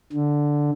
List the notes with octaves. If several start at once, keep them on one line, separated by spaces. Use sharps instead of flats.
D3